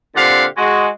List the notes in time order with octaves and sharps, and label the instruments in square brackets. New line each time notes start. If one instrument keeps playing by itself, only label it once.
[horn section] A#2 D3 C4 G4 F5 F#5
G#3 F#4